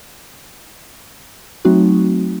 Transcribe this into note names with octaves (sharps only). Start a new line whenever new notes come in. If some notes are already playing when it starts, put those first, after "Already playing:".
F#3 A3 C4 D#4 F#4